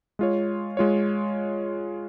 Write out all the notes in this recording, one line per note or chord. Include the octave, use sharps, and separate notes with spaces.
G#3 F4 C#5
G#3 F4 C#5